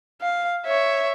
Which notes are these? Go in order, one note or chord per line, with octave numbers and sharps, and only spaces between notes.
F5
C#5 E5